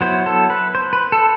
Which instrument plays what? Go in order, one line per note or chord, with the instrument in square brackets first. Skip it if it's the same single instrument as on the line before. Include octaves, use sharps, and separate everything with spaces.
[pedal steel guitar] F#3 B3 E4 C5
A4
B4
C5
B4
A4